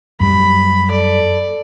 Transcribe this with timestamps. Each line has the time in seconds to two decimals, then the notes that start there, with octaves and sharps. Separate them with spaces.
0.20 F#2 G3 B5
0.89 A4 D5